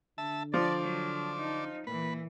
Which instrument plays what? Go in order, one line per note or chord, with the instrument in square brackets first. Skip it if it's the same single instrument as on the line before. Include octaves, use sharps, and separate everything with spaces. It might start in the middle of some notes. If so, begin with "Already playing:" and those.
[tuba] D3 [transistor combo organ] E5 A5
[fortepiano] F3 [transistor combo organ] D4 [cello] D5
[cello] F#3
D#4
[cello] A#2 E3 [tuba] A#3 [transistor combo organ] B4